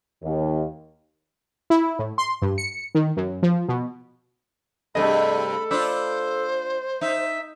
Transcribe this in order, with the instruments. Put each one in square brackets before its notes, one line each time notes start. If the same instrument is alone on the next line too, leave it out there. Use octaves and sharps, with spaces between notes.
[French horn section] D#2
[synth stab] E4
A2
C6
G2
C#7
D#3
F#2
F3
B2
[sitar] G2 C3 [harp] A3 G#4 D#5 [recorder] A4 [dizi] B5
[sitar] D4 F4 [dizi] C5 [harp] B5 E6 G6
[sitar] D#4 [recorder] E5